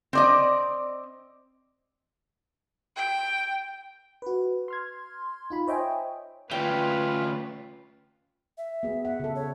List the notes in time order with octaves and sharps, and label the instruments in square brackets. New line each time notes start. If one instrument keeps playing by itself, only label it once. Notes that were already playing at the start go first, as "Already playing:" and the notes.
[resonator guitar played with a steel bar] C4 D5 D#5
[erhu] G5
[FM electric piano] F#4 B4
C6 F6 G#6
D#4 F4 B5
C5 C#5 D#5 E5 G5 G#5
[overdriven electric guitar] D2 C#4 [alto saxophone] F4 [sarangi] B4 [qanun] G5
[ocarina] E5
[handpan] B3 G#4
F#5
C#3 A4
[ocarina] C#5